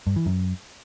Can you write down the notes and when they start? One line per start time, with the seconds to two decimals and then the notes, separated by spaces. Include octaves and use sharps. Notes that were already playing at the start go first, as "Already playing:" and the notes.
0.07 G2
0.16 E3
0.26 F#2